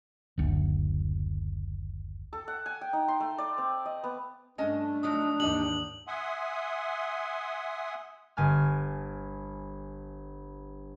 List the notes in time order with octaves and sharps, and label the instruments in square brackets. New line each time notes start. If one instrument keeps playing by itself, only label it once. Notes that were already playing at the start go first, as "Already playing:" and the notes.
[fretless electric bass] F#1 D2
[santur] A4
F#5
G#5
G5
D#4
C6
A3
D5
C4
D#5
B3
[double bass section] G2 A3 [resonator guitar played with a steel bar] C#4 D#5 A5 [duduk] D4
[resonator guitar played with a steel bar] F3 F#3 D#4 [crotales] D#6
[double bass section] D#2 G#2 E3 [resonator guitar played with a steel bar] G3 D#4 D5 [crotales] F#7
[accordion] E5 F#5 G#5 C6 D#6
[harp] G1 G#5 F6